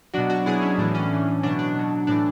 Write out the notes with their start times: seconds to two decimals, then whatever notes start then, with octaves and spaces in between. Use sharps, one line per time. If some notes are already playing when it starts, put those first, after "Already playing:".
0.14 B2 F#3 D4 F#4
0.30 D4 F#4
0.46 B2 F#3 E4 G#4
0.62 C#4 E4
0.78 A2 E3 D4
0.95 C#4
1.11 A2 E3
1.43 B2 F#3 D4
1.59 D4
1.76 B2 F#3
2.07 A2 E3 D4